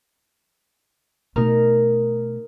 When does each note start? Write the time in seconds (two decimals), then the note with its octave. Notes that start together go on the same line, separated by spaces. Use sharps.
1.36 B2 A3 D#4 A#4